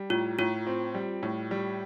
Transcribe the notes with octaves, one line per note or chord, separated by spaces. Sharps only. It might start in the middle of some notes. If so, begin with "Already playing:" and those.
Already playing: G3
A2 F4
A2 F4
C4
G3
A2
G3